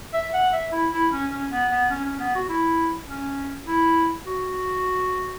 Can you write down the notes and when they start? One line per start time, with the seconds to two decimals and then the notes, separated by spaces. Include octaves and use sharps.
0.13 E5
0.33 F#5
0.52 E5
0.72 E4
0.91 E4
1.12 C#4
1.31 C#4
1.51 B3
1.71 B3
1.90 C#4
2.05 C#4
2.19 B3
2.35 F#4
2.49 E4
3.08 C#4
3.67 E4
4.26 F#4